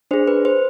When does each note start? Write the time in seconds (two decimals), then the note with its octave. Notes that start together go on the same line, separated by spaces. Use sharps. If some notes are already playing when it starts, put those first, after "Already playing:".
0.11 D4 G#4 C5
0.28 B4
0.45 C5